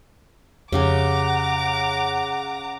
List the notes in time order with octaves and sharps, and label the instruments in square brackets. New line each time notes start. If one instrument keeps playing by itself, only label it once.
[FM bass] F2 [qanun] C#3 G4 G#5 [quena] F#5 [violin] A#5 D6